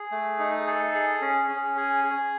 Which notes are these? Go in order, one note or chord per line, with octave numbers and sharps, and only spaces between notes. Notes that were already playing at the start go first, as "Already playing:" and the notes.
Already playing: G#4
A3
D#4
G#4 A4
G#4
C#4
C#4
G#4
G#4